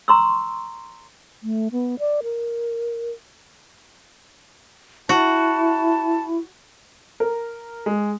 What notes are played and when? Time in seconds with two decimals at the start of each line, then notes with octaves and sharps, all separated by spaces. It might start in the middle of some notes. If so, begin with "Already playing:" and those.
0.08 A#5 C6 C#6 E6
1.43 A3
1.72 B3
1.99 D5
2.23 A#4
5.09 E4 F#4 A5
7.20 A#4
7.86 G#3